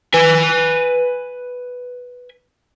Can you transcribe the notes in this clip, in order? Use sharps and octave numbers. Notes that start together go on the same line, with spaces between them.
B4 G#5